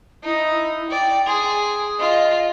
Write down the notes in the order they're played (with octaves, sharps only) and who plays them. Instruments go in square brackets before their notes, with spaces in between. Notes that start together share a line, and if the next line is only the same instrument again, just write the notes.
[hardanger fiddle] D#4 [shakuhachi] E4
[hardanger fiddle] D5 [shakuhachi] G5
[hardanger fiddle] G#4 [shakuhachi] C6
[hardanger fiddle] F4 [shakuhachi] D#5